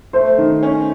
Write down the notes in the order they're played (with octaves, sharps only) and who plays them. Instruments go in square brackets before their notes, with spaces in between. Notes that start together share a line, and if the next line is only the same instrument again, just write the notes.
[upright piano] A3 [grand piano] C5
[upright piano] D#3
C#4